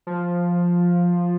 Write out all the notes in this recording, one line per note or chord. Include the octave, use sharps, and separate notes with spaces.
F3